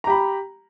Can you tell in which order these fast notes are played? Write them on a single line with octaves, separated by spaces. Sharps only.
A#5 G4 B5